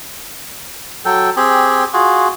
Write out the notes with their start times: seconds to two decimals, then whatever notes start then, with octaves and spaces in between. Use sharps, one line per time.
1.05 F#3 A4 G5
1.36 C4 G4 G#4
1.93 F4 F#4 G#4